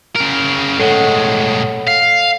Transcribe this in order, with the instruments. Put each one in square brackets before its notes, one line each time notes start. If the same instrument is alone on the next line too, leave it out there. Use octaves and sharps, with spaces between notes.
[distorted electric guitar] C#3 A#4
[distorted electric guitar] A2 G#3 [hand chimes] A4 C#5 F#5
[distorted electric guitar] F5